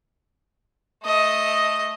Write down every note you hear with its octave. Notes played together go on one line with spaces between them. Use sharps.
A3 D#5